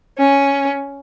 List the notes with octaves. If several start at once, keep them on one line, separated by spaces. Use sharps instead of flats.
C#4